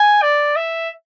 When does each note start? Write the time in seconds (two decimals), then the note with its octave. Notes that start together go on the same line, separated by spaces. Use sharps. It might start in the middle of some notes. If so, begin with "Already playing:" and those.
Already playing: G#5
0.22 D5
0.56 E5